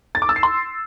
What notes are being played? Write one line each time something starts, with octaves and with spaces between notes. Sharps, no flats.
A6
D6
E6
C7
C6